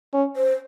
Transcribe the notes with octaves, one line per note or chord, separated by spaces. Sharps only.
C#4
C5